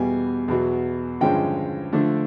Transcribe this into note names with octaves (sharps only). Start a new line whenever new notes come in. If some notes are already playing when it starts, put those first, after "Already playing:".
Already playing: E2 B2 G3 G#5
E2 B2 F#3
G2 D3 F3 G#3 C#4 G5
D3 F3 A3 D4